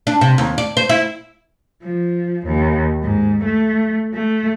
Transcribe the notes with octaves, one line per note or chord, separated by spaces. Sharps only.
D4
C3
D#2
D5
C5
E4
F3
D#2
G#2
A3
A3